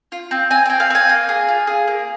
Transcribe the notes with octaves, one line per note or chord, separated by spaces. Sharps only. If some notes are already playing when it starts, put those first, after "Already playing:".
F4
C4
C4 G#5
C4 G5
F5
C4 G#5
A#3
G#4
F4
G#4
A#3